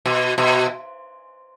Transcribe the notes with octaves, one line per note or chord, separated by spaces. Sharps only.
B2
B2